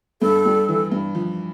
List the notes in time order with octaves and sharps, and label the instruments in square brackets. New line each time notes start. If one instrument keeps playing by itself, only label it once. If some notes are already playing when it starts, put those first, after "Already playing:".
[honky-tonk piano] G2 [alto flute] A4
[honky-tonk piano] G3
E3
G2
F3